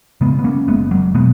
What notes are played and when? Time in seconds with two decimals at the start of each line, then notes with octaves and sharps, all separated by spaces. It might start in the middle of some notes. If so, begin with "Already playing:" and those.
0.21 C#3 G#3 B3
0.39 B3
0.44 A#3 C#4
0.67 F#1 G#3 B3
0.91 F#3 A#3
1.14 B2 G#3 B3